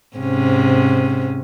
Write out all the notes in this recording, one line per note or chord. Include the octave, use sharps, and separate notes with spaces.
G#2 C3 C#4